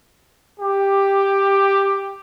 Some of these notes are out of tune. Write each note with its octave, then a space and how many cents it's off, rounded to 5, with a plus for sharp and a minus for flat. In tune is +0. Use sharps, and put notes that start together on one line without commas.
G4 +5